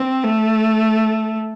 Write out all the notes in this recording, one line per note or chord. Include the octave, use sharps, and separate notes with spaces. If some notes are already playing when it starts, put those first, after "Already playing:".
Already playing: C4
A3